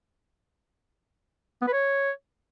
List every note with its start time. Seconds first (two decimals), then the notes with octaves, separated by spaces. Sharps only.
1.62 B3
1.68 B4
1.73 C#5